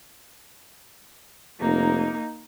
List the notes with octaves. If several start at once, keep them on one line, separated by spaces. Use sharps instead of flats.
F1 A#3 D#4